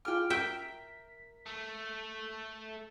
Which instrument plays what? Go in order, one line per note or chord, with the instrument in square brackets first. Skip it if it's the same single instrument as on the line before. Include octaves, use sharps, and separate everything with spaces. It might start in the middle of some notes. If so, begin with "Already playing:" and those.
[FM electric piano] F4 G#4 D6 [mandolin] G5 F6
[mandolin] A#4 [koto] E5 G5 [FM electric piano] B6
[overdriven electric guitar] A3